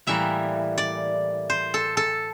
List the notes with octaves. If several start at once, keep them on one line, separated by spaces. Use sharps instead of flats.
A2 E3 G3 A#3 E5
D5
C5
A4
A4